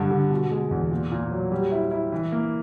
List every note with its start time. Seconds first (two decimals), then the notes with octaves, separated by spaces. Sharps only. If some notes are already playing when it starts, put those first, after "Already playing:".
Already playing: G2 D3
0.11 D3
0.30 B2
0.51 G#3
0.71 E2
0.91 A#2
1.12 A#2
1.31 F#3
1.52 G3
1.72 E4
1.91 E4
2.12 E3
2.32 A#3